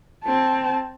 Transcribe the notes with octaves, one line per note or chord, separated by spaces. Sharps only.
C4 A5